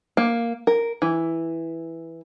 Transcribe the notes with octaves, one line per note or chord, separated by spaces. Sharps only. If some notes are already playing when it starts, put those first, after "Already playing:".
A#3
A#4
E3